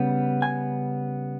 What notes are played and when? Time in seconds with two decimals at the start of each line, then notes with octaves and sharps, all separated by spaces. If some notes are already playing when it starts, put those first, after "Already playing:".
Already playing: C#3 G3 B3
0.42 G#5